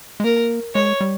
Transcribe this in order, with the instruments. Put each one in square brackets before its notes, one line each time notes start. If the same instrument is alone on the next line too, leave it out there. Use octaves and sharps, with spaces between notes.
[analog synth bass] G#3
[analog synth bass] A#3 [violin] A#4
[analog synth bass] G#3 [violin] C#5
[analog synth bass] G3